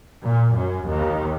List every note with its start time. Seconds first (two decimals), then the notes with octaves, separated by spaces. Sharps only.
0.24 A#2
0.56 F#2
0.88 D#2